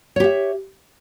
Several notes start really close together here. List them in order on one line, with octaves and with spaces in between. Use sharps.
C#5 G4 E5